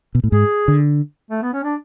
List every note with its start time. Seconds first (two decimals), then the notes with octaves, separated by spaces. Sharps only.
0.15 B2
0.24 A2
0.32 G#2 G#4
0.68 D3
1.31 A3
1.42 B3
1.53 C#4
1.64 D4